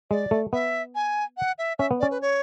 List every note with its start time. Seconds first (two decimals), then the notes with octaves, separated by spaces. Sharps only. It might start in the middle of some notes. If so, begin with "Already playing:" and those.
0.11 G#3 D5
0.31 A3
0.53 B3 E5
0.95 G#5
1.37 F#5
1.58 E5
1.79 C#4 E5
1.91 B3
2.00 D5
2.03 C#4
2.11 B4
2.21 C#5